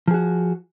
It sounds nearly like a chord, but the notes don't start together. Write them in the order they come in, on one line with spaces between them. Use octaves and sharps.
F3 G#4 F#4